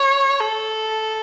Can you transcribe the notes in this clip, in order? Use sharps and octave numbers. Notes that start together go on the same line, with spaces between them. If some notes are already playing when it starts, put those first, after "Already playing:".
Already playing: C#5
A4